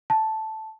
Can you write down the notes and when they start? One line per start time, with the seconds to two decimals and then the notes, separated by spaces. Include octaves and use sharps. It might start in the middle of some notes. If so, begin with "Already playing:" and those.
0.10 A5